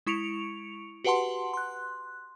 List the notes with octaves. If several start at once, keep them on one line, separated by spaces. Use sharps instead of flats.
G#3 E4 C#6 C#7 D7 F7
F#4 G4 B4 F#5 A5 C6
C6 F#6